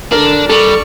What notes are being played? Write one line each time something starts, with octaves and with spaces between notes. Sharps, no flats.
D3 D4 A#4
G3 A4 D5 C#6